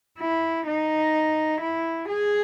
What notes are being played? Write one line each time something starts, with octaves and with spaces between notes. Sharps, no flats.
E4
D#4
E4
G#4